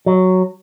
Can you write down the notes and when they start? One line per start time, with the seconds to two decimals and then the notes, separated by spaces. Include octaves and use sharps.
0.06 F#3